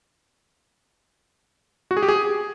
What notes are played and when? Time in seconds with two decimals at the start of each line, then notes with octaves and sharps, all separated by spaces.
1.91 F#4
1.97 G#4
2.03 G4
2.08 G#4